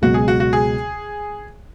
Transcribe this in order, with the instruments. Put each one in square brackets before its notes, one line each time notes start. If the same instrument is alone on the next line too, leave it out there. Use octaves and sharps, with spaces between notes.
[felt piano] C#2 B2 F#3 [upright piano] F#4
[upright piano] G#4
F#4
F#4
G#4